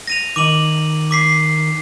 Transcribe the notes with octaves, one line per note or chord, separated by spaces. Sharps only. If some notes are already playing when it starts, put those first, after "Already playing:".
A#6 D#7 F7
D#3 D6 D#7 F#7
D6 B6 C7